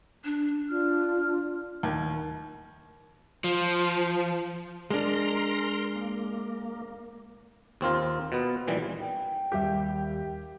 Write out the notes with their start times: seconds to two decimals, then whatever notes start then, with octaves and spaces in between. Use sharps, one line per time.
0.24 D4
0.69 D4 F4 F6
1.83 D#2
3.44 F3
4.90 G#3 D4 A#4 A#5 C6
5.95 A#3
7.81 D#2 C4 F4 A#4
8.32 B2 B3
8.67 A#2 D#3 E3 G3
9.02 G5
9.52 D#2 G3 G4 E5